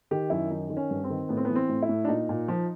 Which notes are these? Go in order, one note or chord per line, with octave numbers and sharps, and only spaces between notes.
D#3 G4
F#2 E4
D#3 D#4
D#3
C#4
G2
C4
D#3
A2 B3
C4
B3
E3
C4
A2
E4
A2
D4
A#2 D#4
A#2
F3